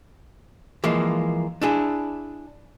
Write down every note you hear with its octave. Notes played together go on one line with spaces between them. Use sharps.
E3 F3 G#3 A#3
D4 E4 G#4